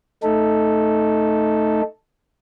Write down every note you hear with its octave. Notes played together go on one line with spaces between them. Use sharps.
A3 D#4 A4